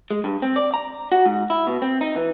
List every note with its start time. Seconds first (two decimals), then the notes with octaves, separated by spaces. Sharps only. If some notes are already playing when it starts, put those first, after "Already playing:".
0.11 G#3
0.24 G2
0.42 C4
0.56 D5
0.74 A#5
1.12 F#4
1.26 G#2
1.50 E4
1.67 B2
1.82 C4
2.01 D#4
2.16 E3